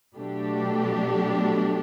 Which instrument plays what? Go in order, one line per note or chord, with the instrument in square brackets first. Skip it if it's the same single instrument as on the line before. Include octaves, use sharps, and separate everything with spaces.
[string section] B2 F#3 A3 D4 G4